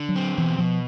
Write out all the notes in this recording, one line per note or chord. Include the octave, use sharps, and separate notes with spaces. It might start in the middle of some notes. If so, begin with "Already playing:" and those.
Already playing: D3
F#3
C4
B2 E3
B2 F3